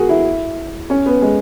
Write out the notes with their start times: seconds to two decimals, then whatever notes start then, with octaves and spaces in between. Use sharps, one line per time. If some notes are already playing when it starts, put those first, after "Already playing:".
Already playing: F#4 G#4 A#4
0.09 E4
0.90 C#4
1.06 B3
1.22 G#3